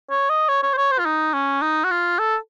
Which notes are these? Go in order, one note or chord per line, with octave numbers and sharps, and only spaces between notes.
C#5
D#5
C#5
C#5
C5
C#5
C5
F4
D#4
C#4
D#4
F#4
F4
A4